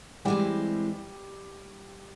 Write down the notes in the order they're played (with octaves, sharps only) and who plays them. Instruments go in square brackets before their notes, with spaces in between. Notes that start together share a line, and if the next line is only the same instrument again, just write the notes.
[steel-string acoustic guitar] E3 G#3 C4 [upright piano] G3 G4